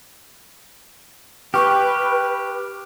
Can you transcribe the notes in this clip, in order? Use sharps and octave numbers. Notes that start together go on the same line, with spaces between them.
G4 B4 C#6 D6 F6